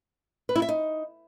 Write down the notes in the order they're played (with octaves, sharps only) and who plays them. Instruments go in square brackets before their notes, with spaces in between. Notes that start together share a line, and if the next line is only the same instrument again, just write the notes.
[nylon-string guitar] B4
E4
E5
D#4